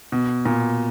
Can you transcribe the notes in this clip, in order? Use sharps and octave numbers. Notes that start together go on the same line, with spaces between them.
B2
A#2